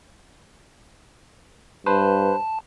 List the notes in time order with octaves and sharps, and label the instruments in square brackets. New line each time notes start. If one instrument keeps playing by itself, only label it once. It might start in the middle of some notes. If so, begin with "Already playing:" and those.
[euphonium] G2 [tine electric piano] B4 C5 [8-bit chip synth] A5